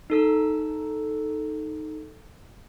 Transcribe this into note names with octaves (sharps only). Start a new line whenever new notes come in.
D#4 A4 E6